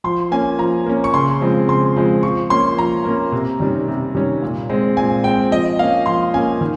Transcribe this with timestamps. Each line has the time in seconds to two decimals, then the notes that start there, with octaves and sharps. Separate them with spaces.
0.04 F3 C6
0.31 A#3 C#4 G#5
0.59 F3 A#5
0.86 A#3 C#4
1.04 C#6
1.14 C#3 C6
1.40 F3 G#3 C4
1.68 C#3 C6
1.96 F3 G#3 C4
2.23 F3 C#6
2.50 A#3 C#4 C6
2.78 F3 A#5
3.05 A#3 C#4
3.32 C3
3.60 D#3 G3 C#4
3.88 C3
4.15 D#3 G3 C#4
4.42 A#2
4.69 G#3 C4
4.97 A#2 G#5
5.24 G#3 G5
5.27 C4
5.51 F3 D#5
5.79 A#3 F5
5.83 C#4
6.06 F3 C6
6.34 A#3 C#4 G#5
6.61 D#3